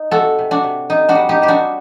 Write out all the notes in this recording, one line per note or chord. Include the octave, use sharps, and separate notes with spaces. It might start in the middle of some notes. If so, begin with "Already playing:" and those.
Already playing: D#4
C3 F#4 A4
C3
D4 F#4
C3
C3 D#4
D4 F#4
G3
D#4 G4
G3 G4
D4 F#4